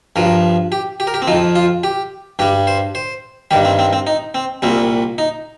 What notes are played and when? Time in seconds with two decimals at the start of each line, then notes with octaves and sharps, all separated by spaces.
0.16 G2 F3 A#4
0.72 G4
1.00 G4
1.07 A#4
1.14 G4
1.22 C4
1.28 F2 F3 D#4
1.56 F4
1.84 G4
2.39 G2 G3 G4
2.67 C5
2.95 C5
3.51 G2 D#3 G3 G4
3.65 C4
3.79 C4
3.93 C4
4.07 D#4
4.35 C4
4.62 C2 A#2 G3 C4
5.18 D#4